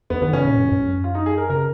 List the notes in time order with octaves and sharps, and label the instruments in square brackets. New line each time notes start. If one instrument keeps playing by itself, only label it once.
[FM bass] F2 [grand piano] B3
[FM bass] D#3 [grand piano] B3
[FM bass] C#3 [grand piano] C#4
[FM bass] A#2
F#2
G#2
F#2
[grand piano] F4
D#4
G#4
A#4
[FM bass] C#3 [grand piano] A#4